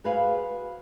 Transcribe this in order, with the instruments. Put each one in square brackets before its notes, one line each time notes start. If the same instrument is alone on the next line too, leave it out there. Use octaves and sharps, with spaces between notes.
[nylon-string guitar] F#4 G#4 B4 C5 F5